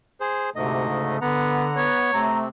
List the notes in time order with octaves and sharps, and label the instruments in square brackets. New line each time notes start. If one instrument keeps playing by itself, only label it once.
[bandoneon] G#4 C5
[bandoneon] D2 G#2 D#5 [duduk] C3 [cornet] A3
[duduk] C#3
[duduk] D3 [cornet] B3 [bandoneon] F#5 A#5
[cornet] B3 [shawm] C#5
[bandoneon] C3 C4 [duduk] A3 [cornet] A#5